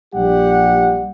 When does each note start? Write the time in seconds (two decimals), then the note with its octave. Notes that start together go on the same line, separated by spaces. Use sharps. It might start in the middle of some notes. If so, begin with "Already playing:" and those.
0.15 A#1 G3 G4 F#5